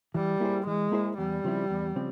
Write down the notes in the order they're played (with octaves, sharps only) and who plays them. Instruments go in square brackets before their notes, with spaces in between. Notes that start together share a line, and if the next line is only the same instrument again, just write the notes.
[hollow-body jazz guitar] E3 [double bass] G3
[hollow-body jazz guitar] A#3 E4 G#4 C5
[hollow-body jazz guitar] E3 [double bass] G#3
[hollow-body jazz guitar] A#3 E4 G#4 C5
[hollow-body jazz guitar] E2 [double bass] G3
[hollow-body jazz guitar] C#3 F3 C4 E4
E2
C#3 F3 C4